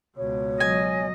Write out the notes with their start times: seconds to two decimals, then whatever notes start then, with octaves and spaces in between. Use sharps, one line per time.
0.17 C#2 B2 C#5
0.60 F#3 D#5 G#5